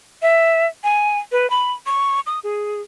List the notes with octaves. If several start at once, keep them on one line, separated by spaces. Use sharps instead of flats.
E5
G#5
B4
B5
C#6
D#6
G#4